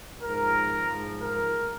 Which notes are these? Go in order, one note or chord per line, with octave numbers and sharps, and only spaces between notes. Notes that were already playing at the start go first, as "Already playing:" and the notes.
G#2 F3 A#4
G#2 F3
A#4